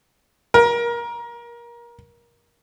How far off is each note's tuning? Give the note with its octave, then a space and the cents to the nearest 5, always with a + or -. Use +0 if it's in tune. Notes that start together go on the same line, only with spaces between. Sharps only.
A#4 +25